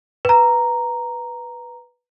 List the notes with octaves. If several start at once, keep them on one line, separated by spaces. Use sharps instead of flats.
B4 A#5